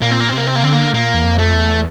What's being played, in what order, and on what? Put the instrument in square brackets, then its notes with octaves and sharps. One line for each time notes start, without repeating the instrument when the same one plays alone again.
[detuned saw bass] A#2 [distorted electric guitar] A#3
[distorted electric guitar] C4
A#3
C4
[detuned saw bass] C3 [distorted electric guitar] A#3
[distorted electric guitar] C4
A#3
[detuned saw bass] D3 [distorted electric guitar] C4
[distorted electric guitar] A#3
[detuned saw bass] A#2 [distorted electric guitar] A#3
[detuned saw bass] E2
F2
[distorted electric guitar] A3
[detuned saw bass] E2